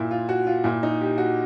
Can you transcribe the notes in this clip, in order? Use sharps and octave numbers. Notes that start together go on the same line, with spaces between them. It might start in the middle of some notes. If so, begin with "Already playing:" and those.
Already playing: A#2 E4
F4
F#4
F4
A#2 E4
D#4
G4
F#4